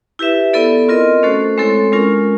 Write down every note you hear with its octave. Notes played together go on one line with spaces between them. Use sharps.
E4 G4 B4 E5
B3 E4 A4 D5
C4 F4 A#4 D#5
A3 C#4 F#4 A4 C5
G#3 C4 E4 A4 C#5
G#3 C#4 F4 A#4